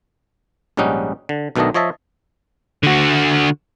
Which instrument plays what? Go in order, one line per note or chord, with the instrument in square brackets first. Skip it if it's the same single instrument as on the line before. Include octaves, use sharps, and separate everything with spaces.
[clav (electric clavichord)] A#1 G#2 G3 C#4 D#4 F#5
D3
B1 B2 D#3 A3 D4 D#5
F3 C#5 D#5 E5 A5
[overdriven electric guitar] D3 F#4